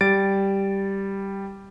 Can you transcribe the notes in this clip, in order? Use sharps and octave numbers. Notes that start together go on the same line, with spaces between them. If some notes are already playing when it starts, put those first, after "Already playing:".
G3 A6 D7